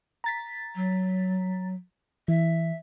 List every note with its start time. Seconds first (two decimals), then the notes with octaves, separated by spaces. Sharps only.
0.24 A#5 A6 B6
0.75 F#3
2.28 E3 E5